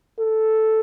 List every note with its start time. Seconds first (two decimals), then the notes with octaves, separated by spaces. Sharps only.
0.19 A4